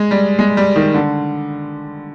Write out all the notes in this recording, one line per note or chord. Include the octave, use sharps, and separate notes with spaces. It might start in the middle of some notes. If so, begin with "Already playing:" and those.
Already playing: G#3
G3
G#3
G3
D#3
D3